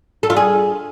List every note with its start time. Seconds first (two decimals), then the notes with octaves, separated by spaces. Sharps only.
0.23 A4
0.30 F4
0.37 G#4